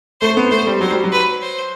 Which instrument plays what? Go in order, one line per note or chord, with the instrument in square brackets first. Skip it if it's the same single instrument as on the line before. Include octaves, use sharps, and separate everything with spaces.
[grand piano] A3 [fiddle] C5
[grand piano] B3
[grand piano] A3 [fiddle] C5
[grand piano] G3
[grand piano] F#3 [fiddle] C5
[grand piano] G3
F#3
[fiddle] B4
C5